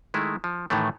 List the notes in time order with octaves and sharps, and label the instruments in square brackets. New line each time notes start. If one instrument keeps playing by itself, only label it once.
[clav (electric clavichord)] D#3 G#3 A3 E4
F3
A2 D#3 E3 A3